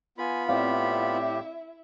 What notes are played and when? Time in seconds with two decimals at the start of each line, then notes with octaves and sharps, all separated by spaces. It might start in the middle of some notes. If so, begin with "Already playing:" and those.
0.18 B3 F4 G#5 B5
0.48 A2 C4 E4 G4 D5 E5 F5